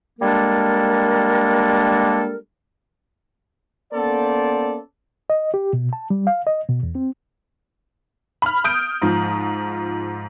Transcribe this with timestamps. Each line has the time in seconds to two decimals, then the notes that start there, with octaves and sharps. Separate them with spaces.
0.20 G3 G#3 A#3 D4 A4 A#4
3.93 A#3 B3 C#4 A4 C5 D5
5.30 D#5
5.54 G4
5.73 B2
5.93 A5
6.10 G3
6.27 F5
6.47 D#5
6.69 B2
6.83 E2
6.95 C4
8.42 B5 F6
8.64 D#6 G6 D7
9.02 G#2 F3